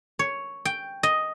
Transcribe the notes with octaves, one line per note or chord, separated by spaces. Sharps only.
C#5
G5
D#5